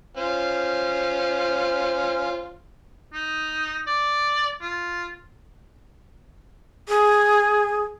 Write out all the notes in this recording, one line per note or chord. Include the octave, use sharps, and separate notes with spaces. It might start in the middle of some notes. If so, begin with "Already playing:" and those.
C#4 F4 C5
D#4
D5
F4
G#4